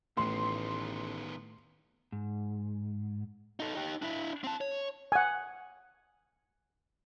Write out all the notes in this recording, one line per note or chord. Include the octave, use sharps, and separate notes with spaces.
A1 A2 D#3 B3 C6
G#2
D#4 A4
D#4 G4
D4 E4
C4 A5
C#5
F#5 G#5